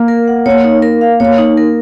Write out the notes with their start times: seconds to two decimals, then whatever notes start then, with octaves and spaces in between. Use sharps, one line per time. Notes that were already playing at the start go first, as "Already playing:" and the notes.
Already playing: A#3
0.08 A#4
0.28 F#5
0.46 A#3 C#5
0.64 D#4
0.82 A#4
1.01 F5
1.20 A#3 C#5
1.38 D#4
1.57 A#4